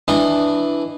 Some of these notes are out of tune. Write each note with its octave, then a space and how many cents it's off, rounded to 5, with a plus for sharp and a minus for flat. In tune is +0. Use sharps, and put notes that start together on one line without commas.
E3 +0 D4 +0 D#5 -15